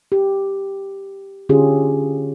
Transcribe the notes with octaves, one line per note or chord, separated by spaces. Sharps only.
G4
D3 C#4 F4 G4 G#4